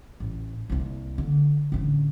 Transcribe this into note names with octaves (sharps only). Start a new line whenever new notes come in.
A1
C2 A#3
D3
A1 D3